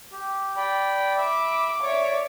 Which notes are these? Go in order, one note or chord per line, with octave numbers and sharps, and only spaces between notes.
G4
D5 G5 B5
E5 B5 D6
C#5 D5 E5 D6